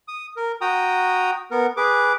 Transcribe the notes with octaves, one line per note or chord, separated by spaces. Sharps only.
D#6
A#4
F#4 G5 A#5 D#6
B3 A#4
G#4 B4 D6